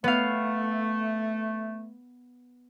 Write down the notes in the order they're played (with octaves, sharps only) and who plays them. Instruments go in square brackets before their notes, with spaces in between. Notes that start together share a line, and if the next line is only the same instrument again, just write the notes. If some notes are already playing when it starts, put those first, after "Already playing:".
[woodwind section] A3 [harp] B3 F5